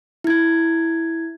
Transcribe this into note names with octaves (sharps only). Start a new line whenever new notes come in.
E4 G#6